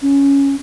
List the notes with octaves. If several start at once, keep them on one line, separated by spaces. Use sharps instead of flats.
C#4